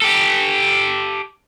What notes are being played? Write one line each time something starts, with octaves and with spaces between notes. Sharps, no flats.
G4 A4